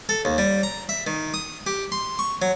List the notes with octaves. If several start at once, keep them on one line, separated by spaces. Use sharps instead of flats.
A4
D#2
G3
A#5
E5
D#3
D#6
G4
C6
C#6
F#3